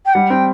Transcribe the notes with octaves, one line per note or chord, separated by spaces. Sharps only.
G5
G3 F#5
C4 G5